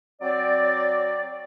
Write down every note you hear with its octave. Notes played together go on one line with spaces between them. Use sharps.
F#3 C4 D5